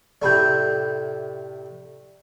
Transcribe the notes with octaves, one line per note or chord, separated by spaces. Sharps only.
A2 C3 A3 D5 B5 G6